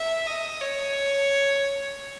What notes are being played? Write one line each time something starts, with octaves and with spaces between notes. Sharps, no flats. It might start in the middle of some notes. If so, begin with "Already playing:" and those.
Already playing: E5
D#5
C#5